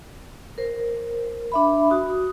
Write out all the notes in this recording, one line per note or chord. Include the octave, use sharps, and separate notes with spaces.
A#4 C5
D4 E5 B5
F#4 D#6